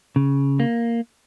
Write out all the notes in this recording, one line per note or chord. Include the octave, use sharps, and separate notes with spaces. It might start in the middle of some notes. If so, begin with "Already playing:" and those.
C#3
A#3